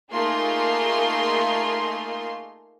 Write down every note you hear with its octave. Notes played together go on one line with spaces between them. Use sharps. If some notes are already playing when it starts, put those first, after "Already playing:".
A3 A#3 D#4 F4 G#4 C6